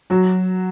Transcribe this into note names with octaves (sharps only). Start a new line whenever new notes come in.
F#3 F#4